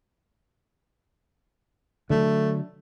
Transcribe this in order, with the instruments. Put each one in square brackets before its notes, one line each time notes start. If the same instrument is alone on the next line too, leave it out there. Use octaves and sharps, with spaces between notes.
[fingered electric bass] D3 F#3 [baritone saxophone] A3